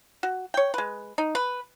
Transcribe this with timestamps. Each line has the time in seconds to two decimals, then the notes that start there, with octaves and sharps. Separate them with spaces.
0.23 F#4
0.54 C#5 G5
0.74 G#3 B4
1.18 D#4
1.35 B4